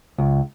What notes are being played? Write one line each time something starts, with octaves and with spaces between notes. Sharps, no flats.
C#2